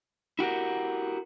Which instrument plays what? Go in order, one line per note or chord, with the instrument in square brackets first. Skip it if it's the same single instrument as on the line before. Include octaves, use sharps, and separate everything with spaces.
[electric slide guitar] E4 F#4 G4 A#4